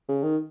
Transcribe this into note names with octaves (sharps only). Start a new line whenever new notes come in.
C#3
D#3